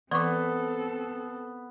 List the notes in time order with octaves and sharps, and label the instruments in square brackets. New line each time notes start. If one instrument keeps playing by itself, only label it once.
[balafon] E3 D6 [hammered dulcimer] B3 [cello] C4 A4 [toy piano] D5 C#6